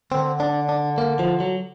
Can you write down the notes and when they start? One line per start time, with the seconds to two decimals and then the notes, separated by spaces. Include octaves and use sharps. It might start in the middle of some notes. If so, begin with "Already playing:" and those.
0.12 D3 C4
0.40 D4
0.69 D4
0.98 A#3
1.19 F3
1.40 F#3